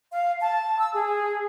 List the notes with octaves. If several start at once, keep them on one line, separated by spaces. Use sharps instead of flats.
F5
A5
E6
G#4